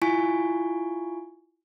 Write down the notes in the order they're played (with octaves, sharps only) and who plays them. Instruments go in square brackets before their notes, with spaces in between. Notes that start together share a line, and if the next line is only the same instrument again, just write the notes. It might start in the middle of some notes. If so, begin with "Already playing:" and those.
[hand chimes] E4 F4 G#5 C#6